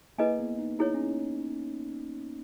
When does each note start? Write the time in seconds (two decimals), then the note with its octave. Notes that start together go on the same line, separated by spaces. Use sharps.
0.18 A#3 E4 G#4 B4 D#5 G#5
0.40 B3
0.59 D#4
0.79 D#4 E4 G#4 C#5
0.94 C#4